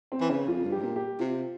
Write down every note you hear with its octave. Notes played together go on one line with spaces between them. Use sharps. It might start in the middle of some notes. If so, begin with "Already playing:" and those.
C4
E3
C#3 C#4
F2 F4
G2
G4
G#2
A#2
G4
C3 F4